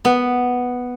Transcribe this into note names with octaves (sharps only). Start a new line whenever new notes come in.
B3